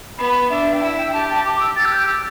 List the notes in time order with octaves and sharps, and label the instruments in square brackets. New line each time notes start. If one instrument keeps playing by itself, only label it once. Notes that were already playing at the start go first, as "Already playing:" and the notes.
[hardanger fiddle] B3 [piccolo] B5
[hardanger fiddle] D4 [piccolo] E5
[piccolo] G5
[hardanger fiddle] E4 [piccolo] E5
[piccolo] E5
G5
[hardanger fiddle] G4 [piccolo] A5
[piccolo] A5
[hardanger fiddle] G4 [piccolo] D6
[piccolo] E6
[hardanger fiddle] G4 [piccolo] A6
[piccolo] E6
G6
E6